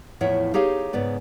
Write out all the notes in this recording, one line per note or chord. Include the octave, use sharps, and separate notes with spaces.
E2 A2 F3 E4 C#5 F#5
D#4 G4 G#4 C#5 F5
G#2 C#3 B3 D5